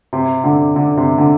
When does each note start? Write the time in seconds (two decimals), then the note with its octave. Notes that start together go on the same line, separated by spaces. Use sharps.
0.13 C3
0.44 D3
0.76 D3
0.97 C3
1.18 D3